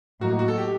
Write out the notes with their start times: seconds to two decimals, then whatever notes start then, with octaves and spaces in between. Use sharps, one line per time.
0.21 A2 F#3 A#3 D#4 F#4
0.39 F#4
0.48 A4
0.58 G4